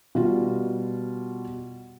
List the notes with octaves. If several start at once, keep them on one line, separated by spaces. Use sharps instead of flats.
B2 G3 F4